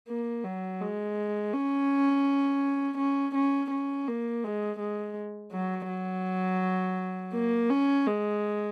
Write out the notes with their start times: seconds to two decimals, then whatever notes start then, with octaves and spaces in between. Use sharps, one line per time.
0.09 A#3
0.44 F#3
0.81 G#3
1.54 C#4
2.98 C#4
3.35 C#4
3.71 C#4
4.08 A#3
4.44 G#3
4.79 G#3
5.52 F#3
5.89 F#3
7.34 A#3
7.70 C#4
8.07 G#3